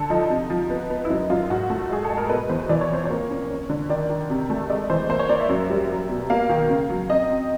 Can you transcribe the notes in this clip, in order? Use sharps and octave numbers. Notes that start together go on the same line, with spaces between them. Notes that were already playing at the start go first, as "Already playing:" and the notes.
Already playing: D3 A4
F3 D#4
C3
F3
B3
B3
E4
F#2 D#4
F#2 F4
G#2 F#4
A3
G#3 G#4
A4
G#3
A#4
B2 B4
E2 C5
E3 D5
C#5
F2 C5
A#3 C#5
C#4
C#4
D3
D#3 D5
D#3
C3
A3
G#3 D5
E3 C5
A#3 C5
C#5
A#3 D5
E5
F#2
G3
F#3
B2
A#3 F5
D#3
C#3
F#3
C4 D#5
C4